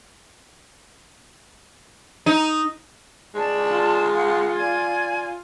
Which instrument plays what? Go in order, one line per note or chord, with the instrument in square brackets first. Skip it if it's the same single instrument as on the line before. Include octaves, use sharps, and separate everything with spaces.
[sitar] D#4
[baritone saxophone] G#3 [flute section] D5 A5
[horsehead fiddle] F4
[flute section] F5 F#5
D5 G#5 G#6